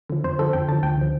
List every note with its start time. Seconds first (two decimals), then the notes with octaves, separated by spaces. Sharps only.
0.10 D3 F3
0.24 F2 C5
0.39 D3 F3 A4
0.53 F2 G5
0.69 D3 F3 A5
0.83 D2 G5
0.98 D3 F3